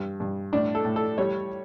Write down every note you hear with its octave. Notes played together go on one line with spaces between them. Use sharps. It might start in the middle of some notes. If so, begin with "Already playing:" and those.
Already playing: G2
G2
A2 D4
A4
A2
A4
G3 C#5